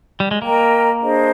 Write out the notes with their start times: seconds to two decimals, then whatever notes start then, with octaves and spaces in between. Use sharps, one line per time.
0.20 G3
0.31 G#3
0.42 A#3 A#4 D#5 G5 A#5
1.00 D4 G#4 C5 D#5